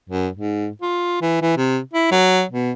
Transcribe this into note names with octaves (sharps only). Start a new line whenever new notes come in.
F#2
G#2
F4
E3
E3
C3
E4
F#3
B2